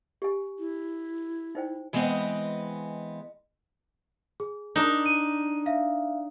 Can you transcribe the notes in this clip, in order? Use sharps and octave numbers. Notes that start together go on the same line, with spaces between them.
G4 G#5
E4
D#4 C5 G5
E3 G#3 B3 C4 B4 D#5
G#4
D4 D#4
D#7
E5 F5